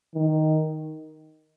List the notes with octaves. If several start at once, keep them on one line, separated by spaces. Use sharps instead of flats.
D#3